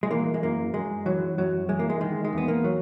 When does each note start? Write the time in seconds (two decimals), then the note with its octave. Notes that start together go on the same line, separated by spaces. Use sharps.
0.03 G#3
0.11 E3 A#3
0.34 G#3
0.42 F#2 A#3
0.74 F#2 G#3
1.06 E3 F#3
1.38 F#2 F#3
1.69 E3 G#3
1.79 A#3
1.90 G#3
2.01 D#3 G#3
2.25 G#3
2.33 E2
2.38 B3
2.48 A#3
2.64 F#3